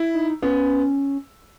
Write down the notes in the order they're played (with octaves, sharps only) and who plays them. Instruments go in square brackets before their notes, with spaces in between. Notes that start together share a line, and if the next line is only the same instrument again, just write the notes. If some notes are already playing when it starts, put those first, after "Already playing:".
Already playing: [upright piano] E4
[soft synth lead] D#4
[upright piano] B3 [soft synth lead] C#4